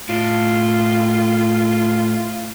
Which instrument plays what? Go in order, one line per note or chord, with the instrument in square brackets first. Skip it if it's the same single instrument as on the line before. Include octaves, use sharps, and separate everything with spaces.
[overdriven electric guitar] A2 [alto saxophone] F4